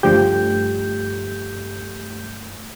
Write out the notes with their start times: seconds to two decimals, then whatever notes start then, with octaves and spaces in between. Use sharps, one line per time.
0.03 G2 D3 F3 A3 G4 G6